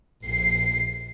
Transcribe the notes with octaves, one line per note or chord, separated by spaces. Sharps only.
A#1 C7